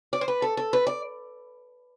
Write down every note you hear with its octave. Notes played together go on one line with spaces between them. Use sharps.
D5
C5
B4
A4
A4
B4
D5